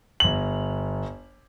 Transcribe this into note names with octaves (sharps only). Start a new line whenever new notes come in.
G1 F#7